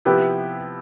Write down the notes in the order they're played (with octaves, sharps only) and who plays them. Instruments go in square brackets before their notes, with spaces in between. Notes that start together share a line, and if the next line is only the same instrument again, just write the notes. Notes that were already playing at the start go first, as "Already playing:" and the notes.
[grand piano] C3 F3 B3 E4 [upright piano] G4 B4